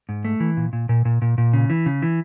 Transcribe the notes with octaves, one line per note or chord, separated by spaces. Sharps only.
G#2
A3
E3
A#2
A#2
A#2
A#2
A#2
A#2
C#3
E3
C#3
E3